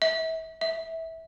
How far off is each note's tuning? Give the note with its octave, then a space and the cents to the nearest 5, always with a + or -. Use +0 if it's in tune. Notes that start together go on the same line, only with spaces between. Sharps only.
E5 -35
E5 -20